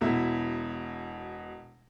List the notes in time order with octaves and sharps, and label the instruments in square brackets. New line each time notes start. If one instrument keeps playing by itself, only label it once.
[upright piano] E1 B2 E4